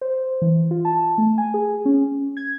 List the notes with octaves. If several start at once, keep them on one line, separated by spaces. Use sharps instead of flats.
C5
E3
F4
A5
A3
G#5
G#4
C#4
G#6